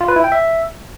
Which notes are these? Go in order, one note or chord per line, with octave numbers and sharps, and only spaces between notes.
F4
B4
E4
G5
E5